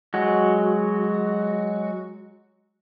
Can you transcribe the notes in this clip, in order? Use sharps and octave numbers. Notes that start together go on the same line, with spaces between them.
F#3 G#3 F#4